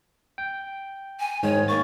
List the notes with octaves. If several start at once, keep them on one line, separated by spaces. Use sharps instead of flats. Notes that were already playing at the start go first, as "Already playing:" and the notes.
G5
G#5
G#2 D#3 C#5
A#3 C#6 A6